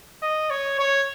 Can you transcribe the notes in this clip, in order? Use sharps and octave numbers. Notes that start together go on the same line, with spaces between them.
D#5
C#5
C#5